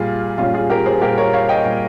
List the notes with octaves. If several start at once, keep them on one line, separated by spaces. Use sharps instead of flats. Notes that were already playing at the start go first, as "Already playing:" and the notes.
Already playing: A#2 G3 F4 G#4
A#2 G3 C#4 F4
F4 G#4
G4 A#4
G#4 C5
A#2 G3 G4 A#4
A#4 C#5
C#5 F5
D#5 G5
A#2 G3